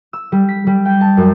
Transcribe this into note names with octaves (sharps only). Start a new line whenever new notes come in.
E6
G3
B6
G3
G5
A5
F#2